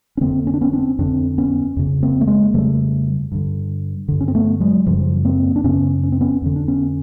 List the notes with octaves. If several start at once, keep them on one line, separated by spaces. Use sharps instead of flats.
C#4
F2 D3 A#3 C4
C#4
D4
B3 C#4
C4 D4
F2 D3 C4 D4
B3 C#4
F2 C#3
A#3 C4
A3
G#3 A#3
F2 C#3 G3 A3
G2 D3
G2 D3
C#4
C4
A3 B3
F#3 G#3
F#2 C#3 F3 G3
A#3 C4
D4
F#2 C#3 B3 C#4
C#4
C4
B3 C#4
F2 D3
D4
B3 C#4